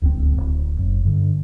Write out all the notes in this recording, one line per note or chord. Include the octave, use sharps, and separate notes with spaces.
D1 C#2 D#3 C4
D1
F#1 F#2
G2 D3